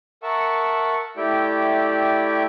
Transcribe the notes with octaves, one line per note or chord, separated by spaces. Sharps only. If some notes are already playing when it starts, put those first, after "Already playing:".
A#4 E5 F#5 A5 C#6 E6
A3 E4 G4 D5 E5 G5